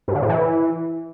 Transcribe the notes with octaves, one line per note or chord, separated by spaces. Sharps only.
G2
D3
A2
E3